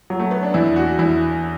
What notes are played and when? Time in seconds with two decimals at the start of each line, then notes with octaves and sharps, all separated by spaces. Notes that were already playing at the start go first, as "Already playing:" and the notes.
0.10 F#3
0.19 A3
0.31 B3
0.43 D4
0.54 E2 E4
0.76 F#4
0.99 E2 E4